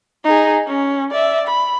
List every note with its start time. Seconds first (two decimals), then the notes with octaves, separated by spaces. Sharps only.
0.25 D#4 G#4
0.67 C#4
1.11 D5 E5
1.47 B5